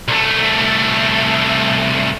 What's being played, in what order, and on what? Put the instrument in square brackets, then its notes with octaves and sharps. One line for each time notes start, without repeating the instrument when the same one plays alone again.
[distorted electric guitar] C2 A3